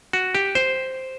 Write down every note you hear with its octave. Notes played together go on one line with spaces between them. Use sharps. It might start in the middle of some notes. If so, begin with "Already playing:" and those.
F#4
G4
C5